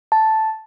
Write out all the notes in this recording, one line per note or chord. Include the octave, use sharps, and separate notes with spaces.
A5